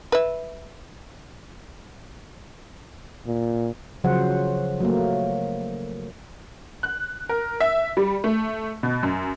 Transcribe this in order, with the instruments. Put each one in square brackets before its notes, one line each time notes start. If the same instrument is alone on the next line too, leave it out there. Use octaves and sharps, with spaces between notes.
[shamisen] B4 E5
[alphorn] A#2
[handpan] C#3 F3 F#3 C5 F#5
F#3 A3 A#3
[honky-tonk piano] F#6
A#4
E5
G3
A3
B2
F#2